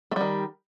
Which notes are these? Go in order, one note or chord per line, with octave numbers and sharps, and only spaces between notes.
D#3 G3 A3